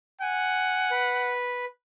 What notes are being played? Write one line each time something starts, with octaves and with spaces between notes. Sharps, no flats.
F#5 G#5
B4